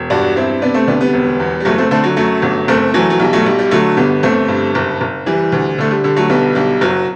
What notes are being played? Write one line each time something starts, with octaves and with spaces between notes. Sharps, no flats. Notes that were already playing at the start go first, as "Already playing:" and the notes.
Already playing: E1
G2 D4 F#4
G2 C4 E4
C3 B3 D4
A3 C4
D2 B3 D4
G3 B3
E1
E2
G3
F#1 F#3 A3
A3 C4
D3 A3 C4
F#3
F#2 F#3 A3
G1
F#1 A3 C4
E3 F#3 A3
F#3
B1 G3
F#3 A3
B1 G3
G3
D3 F#3 A3
G1 G3 B3
G1 A3 C4
G2
F#1
F#1
E3 G3
D2
D3 A3
G3
D3 G3
F#3 A3
B1 G3 B3
B1 G3
F#1 F#3